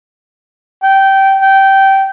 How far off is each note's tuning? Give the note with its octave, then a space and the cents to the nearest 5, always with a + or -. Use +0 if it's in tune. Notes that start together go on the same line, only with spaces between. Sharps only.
G5 -15
G5 -15